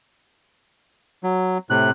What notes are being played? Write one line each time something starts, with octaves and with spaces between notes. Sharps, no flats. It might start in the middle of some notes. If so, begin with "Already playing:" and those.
F#3
A2 C3 F#6